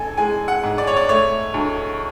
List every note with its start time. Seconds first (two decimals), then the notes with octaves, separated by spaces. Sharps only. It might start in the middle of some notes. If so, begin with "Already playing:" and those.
Already playing: A1 A4 G#5
0.17 G#3 G#5
0.48 F#5
0.63 G#2
0.78 D5
0.87 C#5
0.97 D5
1.09 A3 C#5
1.54 D2